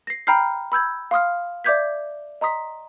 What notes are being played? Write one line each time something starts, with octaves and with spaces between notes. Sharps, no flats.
A#6 C7
G5 A#5 B5 F6 G6 C7
B5 E6 G6 G#6
F5 C6 D#6 F6
D5 E5 D6 G6 G#6 B6
D#5 A#5 C6 D#6 B6